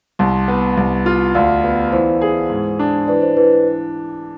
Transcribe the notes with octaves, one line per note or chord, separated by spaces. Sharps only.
C2 A5 C6
B3
C2
F4
D2 D5 F5
B3
E3 C5
G#4
G#2
D4
E3 B4 D5
C5
E3 B4
B4